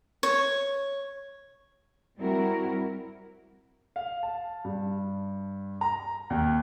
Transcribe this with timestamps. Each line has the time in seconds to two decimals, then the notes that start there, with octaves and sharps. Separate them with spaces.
0.23 C#5
2.17 G3 C4 E4 F#4 A#4
3.96 F5
4.23 A5
4.65 G2
5.81 A#5
6.30 D#2